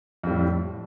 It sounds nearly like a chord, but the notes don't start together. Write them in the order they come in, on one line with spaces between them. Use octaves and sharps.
F2 G3 A2